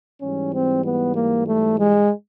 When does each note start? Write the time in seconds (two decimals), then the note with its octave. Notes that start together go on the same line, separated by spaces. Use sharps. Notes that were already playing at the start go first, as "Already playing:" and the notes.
0.22 G#2 E3 G3 C#4
0.53 C4
0.85 B3
1.16 A#3
1.48 A3
1.80 G#3